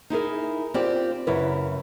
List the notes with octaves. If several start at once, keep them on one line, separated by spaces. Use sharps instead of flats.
D#4 E4 G#4 A#4
C4 F4 G4 D5
F#2 C#3 E4 A#4 B4